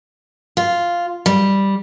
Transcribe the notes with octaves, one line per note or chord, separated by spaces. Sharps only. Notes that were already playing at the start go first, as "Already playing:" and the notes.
F4
G3